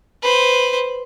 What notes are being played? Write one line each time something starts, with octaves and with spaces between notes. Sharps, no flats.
B4 C5